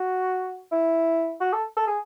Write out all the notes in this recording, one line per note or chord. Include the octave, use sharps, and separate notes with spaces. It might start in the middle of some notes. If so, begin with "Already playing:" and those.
Already playing: F#4
E4
F#4
A4
A4
G#4